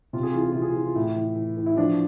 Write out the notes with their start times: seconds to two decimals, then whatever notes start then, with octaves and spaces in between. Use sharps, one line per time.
0.13 C3 F4
0.23 G#4
0.32 E3 F4
0.42 G#4
0.52 C3 F4
0.62 G#4
0.71 E3 F4
0.85 F4
0.95 A2 E4
1.16 E3
1.36 E3
1.57 E3
1.66 E4
1.77 F3 D4